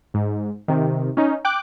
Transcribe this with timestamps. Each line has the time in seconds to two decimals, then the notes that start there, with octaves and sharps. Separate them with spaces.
0.14 G#2
0.68 C3 D#3
1.17 C#4 D#4
1.45 G5 D6 F#6